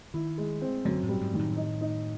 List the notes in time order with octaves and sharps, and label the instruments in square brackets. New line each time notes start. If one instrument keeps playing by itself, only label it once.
[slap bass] D#3 [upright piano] E4
[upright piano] G#3
C4
[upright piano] F#2 [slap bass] D3
[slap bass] A2
[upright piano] G3
[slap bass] G#2
[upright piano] D#3
[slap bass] A2
[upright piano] D#4
D#4